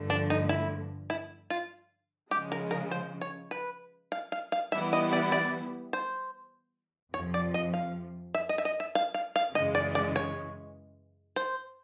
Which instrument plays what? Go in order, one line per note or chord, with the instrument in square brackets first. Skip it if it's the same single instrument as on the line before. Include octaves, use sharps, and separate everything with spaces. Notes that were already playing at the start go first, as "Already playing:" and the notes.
Already playing: [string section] G2 D3 F3 A3
[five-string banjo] D4
D#4
E4
E4
F4
[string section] C#3 F3 G#3 [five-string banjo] G4
[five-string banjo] A#4
A#4
C5
C#5
B4
F5
F5
F5
[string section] E3 G3 B3 E4 [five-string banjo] E5
[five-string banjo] D#5
D5
D5
C5
[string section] F2 C3 F3 [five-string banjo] C#5
[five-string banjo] D5
D#5
F5
E5
D#5
E5
D#5
E5
F5
F5
F5
[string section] F#2 C#3 E3 G#3 [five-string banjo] D#5
[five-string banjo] D5
D5
C#5
C5